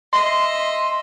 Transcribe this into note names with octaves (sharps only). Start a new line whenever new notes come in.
D#5 E5 C6